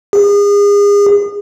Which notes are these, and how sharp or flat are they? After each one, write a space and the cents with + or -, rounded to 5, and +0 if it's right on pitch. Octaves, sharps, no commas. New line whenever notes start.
G#4 -35